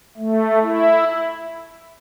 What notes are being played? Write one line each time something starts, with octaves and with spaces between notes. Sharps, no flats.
A3
E4